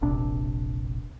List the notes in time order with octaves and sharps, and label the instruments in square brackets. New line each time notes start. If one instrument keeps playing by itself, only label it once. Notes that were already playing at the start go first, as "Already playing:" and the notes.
[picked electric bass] E1 A#1 C3 D4